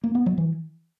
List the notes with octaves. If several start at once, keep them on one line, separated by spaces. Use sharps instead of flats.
A#3
B3
F#3
E3